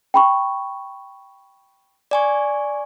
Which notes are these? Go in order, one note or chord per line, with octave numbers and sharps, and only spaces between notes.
G5 B5 C#6
D5 G#5 C#6